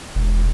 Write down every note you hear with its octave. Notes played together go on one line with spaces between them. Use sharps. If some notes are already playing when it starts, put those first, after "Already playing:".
E1